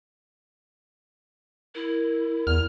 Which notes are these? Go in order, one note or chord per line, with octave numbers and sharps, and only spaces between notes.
E4 A#4
E2 F6